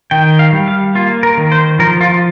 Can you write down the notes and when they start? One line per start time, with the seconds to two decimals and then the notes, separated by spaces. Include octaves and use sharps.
0.11 D#3 G5
0.39 F5
0.53 G3
0.68 F5
0.95 A#3 F4
1.23 A#4
1.37 D#3
1.52 C5
1.79 F3 A#4
2.01 F4